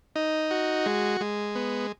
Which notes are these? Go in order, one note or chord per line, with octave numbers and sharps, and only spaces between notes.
D#4
F#4
G#3
G#3
B3